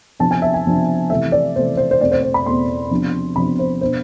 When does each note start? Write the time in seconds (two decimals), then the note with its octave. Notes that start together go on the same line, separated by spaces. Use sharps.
0.20 C3 F3 B3 D4 A5
0.31 G#5
0.42 E5
0.54 G#5
0.65 C3 F3 B3 D4
1.10 C3 E3 A3 E5
1.32 D5
1.56 C3 E3 A3 C5
1.77 C5
1.91 C5
2.00 E2 B2 A3 C4 D5
2.11 C5
2.23 C5
2.34 B5
2.46 E2 B2 A3 C4 C6
2.91 C3 F3 B3 D4
3.35 C3 F3 B3 D4 B5
3.59 C5
3.81 B2 B3 D4 C5